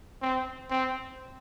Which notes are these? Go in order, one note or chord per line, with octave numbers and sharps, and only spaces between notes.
C4
C4